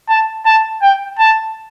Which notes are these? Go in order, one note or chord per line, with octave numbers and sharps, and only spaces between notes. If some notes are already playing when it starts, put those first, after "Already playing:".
A5
A5
G5
A5